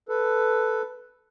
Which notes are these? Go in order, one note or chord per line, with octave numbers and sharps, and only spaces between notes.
A4 B4